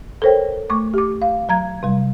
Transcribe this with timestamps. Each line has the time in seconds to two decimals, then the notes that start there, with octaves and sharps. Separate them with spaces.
0.22 A4 A#4 C5 C#5 G5
0.70 A3 C#6 D6
0.94 G4 D6
1.22 F5
1.49 F#3 A#5 G#6
1.83 C3 G3